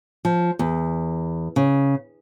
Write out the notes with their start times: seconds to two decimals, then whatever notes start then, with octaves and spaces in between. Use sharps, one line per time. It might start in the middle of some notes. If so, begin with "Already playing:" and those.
0.25 F3
0.59 E2
1.56 C#3